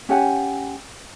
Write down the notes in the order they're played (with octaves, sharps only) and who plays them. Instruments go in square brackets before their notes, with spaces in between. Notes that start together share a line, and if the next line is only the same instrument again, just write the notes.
[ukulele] C#4 G4 F#5 G#5